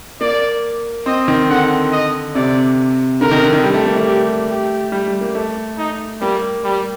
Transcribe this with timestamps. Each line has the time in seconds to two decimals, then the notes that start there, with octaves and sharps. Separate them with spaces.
0.21 A#3 D5
1.06 C4 D#5
1.28 D#3
1.50 D3 F#5
1.92 D#5
2.35 C3 D5
3.21 D3 A#4
3.31 D#3
3.43 D3
3.53 D#3
3.64 G3
3.74 A3
3.86 A#3
3.96 A3
4.06 G4
4.49 G4
4.92 G3
5.07 G3
5.21 A#3
5.35 A3
5.78 D#4
6.21 G3 A#3
6.64 G3